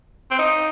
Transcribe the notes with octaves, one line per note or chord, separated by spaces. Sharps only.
C4
D#4